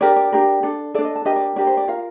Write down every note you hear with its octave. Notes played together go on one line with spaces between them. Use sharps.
D4 G4 A#4 D5
D5
D4 G4 A#4
D4 A4
D4 A4 D5
D#5
A5
D4 G4 A#4 D#5
D5
D4 G4 A#4 D5
C5
D5
F4 A#4 F5